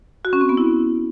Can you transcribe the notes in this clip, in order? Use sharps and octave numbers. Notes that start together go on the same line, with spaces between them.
F#4
C#4
C4
B3
E4